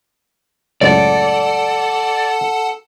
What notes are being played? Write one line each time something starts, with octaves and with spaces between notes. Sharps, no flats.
C#2 F#2 A2 A4 D5 F#5 A5